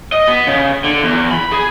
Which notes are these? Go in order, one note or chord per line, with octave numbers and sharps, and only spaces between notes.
D#5
B3
C#3
D3
E2
B5
G#4